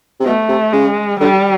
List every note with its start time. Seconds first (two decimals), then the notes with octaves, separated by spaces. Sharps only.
0.20 C3
0.25 B2 A3
0.49 C3
0.72 C#3 G#3
1.20 D3 G3